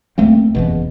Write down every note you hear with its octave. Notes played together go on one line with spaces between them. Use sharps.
C#2 A3 A#3 C4
F#1 E2 B2